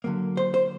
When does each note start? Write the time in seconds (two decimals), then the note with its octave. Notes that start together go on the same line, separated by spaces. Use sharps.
0.04 D3 F#3 A#3
0.37 C5
0.54 C5